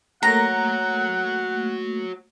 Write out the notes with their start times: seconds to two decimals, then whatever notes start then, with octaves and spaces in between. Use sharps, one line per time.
0.23 A3 A#3 F#4 C#5 F#5 A#5